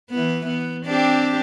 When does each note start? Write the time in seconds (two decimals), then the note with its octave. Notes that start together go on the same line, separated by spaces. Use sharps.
0.11 E3 B3
0.47 B3
0.86 C4 D4 G4